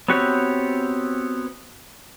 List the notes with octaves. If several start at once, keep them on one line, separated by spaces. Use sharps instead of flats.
B3 C4 F#4 G4 C#5